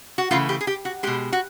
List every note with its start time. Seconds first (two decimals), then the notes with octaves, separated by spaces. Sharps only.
0.18 F#4
0.31 C#3 E3 A3 F4
0.49 G4
0.61 G#4
0.67 G4
0.85 F#4
1.03 B2 G#3 G4
1.32 F#4